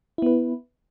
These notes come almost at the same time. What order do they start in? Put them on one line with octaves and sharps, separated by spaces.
E4 B3 B4